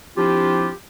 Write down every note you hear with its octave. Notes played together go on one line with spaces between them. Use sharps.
F3 C4 D4 E4 F4 G4